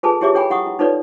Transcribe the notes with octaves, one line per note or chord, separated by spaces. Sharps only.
F4 G#4 A4 B4 G#5 A5
E4 G4 G#4 C#5 E5 D6
E4 A4 C#5 G5 G#5 B5
E4 F#5 C#6 D#6
E4
D#4 F4 A4 B4 C#5 D5